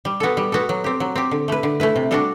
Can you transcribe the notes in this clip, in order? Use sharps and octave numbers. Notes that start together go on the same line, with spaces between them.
G3
B3 F#4 A4
G3
B3 F#4 A4
F#3
C4 G4
F#3
C4 G4
D3
A3 E4 B4
D3
A3 E4 B4
C3
G3 D4 F#4 A4